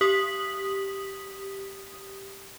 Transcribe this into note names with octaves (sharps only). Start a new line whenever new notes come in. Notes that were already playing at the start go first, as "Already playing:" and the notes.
G4 D#6 B6 F#7